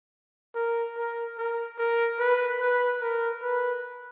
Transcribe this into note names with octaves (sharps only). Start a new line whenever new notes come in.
A#4
A#4
A#4
A#4
B4
B4
A#4
B4